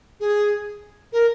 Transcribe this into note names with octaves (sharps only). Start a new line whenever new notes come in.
G#4
A#4